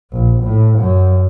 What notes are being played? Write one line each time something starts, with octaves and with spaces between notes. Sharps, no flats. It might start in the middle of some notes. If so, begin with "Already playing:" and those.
A#1
A2
F#2